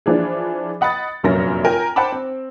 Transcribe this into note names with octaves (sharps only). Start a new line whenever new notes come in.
E3 F3 D4 G#4
D#5 F#5 B5 D#6 A6
F1 A#1 F#2 C#4 A#4 A#6
F4 A#4 G5 G#5 A#5
C5 F#5 G5 A5 B5 D6
C4